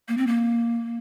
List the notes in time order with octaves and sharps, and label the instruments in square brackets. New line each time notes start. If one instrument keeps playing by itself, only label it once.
[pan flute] A#3
C4
A#3